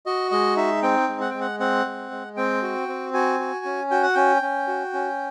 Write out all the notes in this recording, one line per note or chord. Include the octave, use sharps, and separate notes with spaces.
F#4 D#5
G#3 D#5
D#4 E5
C4 G5
G#3
F#5
G#3 G5
F#5
C4 F#5
G#3
G#3
C4 G5
F#4
C4
F#4 G#5
F#4
C#4
F#4 G5
F#5
C#4 G5
C#4
F#4
C#4